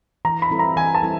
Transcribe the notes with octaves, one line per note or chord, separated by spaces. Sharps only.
E3 A#5
B5
G3 C4 E4 A4
A#5
E3 G#5
A5
G3 C4 E4 A4